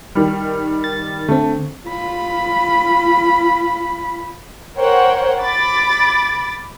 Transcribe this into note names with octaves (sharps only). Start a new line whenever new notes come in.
D#3 G3
A6
D3 A3 C4
F4 B5
A#4 C5 C#5 F#5 G5
B5 D6 A6